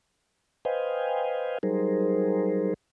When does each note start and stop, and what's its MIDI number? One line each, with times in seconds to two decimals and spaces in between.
0.65 1.58 71
0.65 1.58 72
0.65 1.58 75
0.65 1.58 77
0.65 1.58 79
0.65 1.58 80
1.63 2.74 54
1.63 2.74 55
1.63 2.74 63
1.63 2.74 68
1.63 2.74 70
1.63 2.74 72